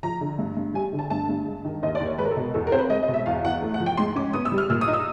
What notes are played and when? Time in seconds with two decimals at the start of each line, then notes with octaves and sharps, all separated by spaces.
0.03 F3 A#5
0.21 D3
0.39 G2
0.57 G2
0.74 G3 G#5
0.93 D3
0.99 A5
1.10 G2 A5
1.29 G2
1.46 G#3
1.65 D#3
1.83 D#2 D#5
1.95 D5
2.00 D#2
2.06 C#5
2.18 G#3 B4
2.25 A#4
2.31 A4
2.36 B2
2.54 E2 A4
2.67 A#4
2.72 C4 C5
2.79 B4
2.90 G#3 D#5
3.03 D#5
3.08 B2
3.14 E5
3.26 E2 F5
3.44 E2 F#5
3.62 A3
3.74 F#5
3.80 F3
3.86 G5
3.97 G#2 C6
4.16 C#4 D6
4.33 B3 D#6
4.45 E6
4.52 G3
4.58 F6
4.70 A#2 E6
4.81 D#6
4.88 D#4
4.93 E6